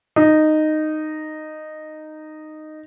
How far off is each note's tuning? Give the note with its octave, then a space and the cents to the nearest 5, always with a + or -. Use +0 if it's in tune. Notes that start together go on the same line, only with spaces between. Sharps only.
D#4 -10